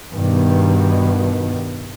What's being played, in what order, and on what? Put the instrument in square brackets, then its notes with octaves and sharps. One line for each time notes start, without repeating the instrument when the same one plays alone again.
[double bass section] G2 B2 D#3